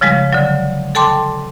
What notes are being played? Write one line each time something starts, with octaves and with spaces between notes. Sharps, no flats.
C#3 F3 G3 G#3
D3 F#3
A4 G5 A5 C6 D6